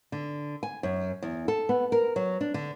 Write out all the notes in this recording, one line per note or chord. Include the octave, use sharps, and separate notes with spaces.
D3
G#5
F#2
E2
A4
B3
A#4
F#3
D4
D3